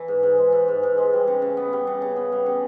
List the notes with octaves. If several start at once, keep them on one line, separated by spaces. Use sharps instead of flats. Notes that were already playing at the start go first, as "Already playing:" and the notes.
Already playing: E3
G#2
G#2
G#3
E3
G#2
G#2
G#3
G3
C#3
C#3
B3
G3
C#3
C#3
B3
G3
C#3